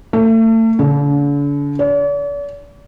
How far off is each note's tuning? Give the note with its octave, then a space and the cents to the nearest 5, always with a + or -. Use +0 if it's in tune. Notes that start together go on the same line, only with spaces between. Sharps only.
A3 +35
D3 -40
D5 -45